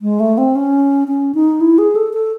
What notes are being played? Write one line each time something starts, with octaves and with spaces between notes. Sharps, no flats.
G#3
A3
C4
C#4
C#4
D#4
E4
G#4
A4
A4